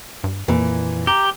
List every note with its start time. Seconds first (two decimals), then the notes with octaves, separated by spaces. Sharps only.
0.24 G2
0.48 F2 A#2 E3
1.07 G4 A#5